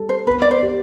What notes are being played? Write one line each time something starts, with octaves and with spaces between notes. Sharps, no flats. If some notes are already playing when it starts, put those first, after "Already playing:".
Already playing: G3 A4
C5
B3 B4
D5
C5
G4